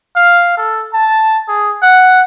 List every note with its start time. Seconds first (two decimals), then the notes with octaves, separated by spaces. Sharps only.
0.16 F5
0.57 A4
0.93 A5
1.48 G#4
1.82 F#5